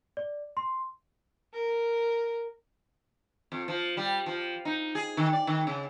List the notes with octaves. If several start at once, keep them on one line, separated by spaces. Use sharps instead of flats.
D5
C6
A#4
F2
F3
G3
F3
D#4
G#4
D#3
D5
D#3
C#3